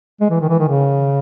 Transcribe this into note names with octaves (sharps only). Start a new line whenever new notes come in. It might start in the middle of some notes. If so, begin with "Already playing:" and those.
G#3
E3
D#3
E3
D#3
C#3